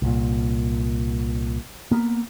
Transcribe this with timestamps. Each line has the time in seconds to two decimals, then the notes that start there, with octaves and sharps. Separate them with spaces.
0.02 C2 A#2
1.91 A#3 B3